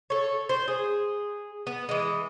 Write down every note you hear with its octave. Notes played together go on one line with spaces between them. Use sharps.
A4 C#5
C5
G#4
B3
E3 G#3